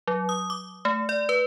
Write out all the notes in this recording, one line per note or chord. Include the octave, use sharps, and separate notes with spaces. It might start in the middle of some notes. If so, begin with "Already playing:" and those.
F#3
D#6
D6
A3
D5
B4